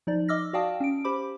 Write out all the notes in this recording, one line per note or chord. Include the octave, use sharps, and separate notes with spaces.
F3 D#4 D5
D#5 D6 E6 F6 A#6
F#4 D5 F5 G5 A5 D#6
C#4 D7
G4 C5 B5 D6